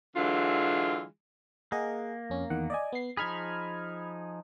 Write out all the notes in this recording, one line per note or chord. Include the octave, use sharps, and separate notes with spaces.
D3 E3 F#3 G#3 F4
A#3 G#4 D#5 F#5
F2 C#4
E2 D#3 F#5
D5 D#5 G#5
B3 C7
F3 D#4 G#4 B5 F6 G#6